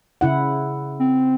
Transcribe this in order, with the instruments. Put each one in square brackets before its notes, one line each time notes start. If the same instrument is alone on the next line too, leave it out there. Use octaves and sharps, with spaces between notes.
[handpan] C#3 E4 F#5
[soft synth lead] C4